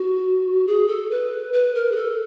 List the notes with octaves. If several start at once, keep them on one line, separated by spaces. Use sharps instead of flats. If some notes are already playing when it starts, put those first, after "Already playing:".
Already playing: F#4
G#4
A4
B4
B4
A#4
G#4
A4